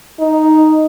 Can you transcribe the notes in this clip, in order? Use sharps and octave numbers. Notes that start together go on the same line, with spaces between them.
D#4